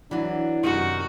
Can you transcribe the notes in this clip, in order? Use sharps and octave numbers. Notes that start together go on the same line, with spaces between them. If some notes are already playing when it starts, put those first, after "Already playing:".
E3 F#3 D4
F#2 C3 D#3 F#4